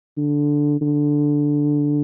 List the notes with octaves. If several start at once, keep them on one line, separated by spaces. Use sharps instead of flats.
D3
D3